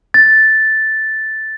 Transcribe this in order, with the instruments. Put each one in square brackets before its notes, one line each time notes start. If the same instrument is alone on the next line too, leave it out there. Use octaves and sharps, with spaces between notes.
[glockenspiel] A6